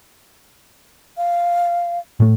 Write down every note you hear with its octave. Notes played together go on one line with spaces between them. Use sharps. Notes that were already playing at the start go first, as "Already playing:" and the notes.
F5
A2 A3